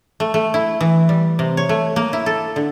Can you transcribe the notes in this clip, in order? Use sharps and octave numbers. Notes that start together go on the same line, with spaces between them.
A3
A3
E4
E3
G3
C3
C#5
A3
A#3
E4
A4
D3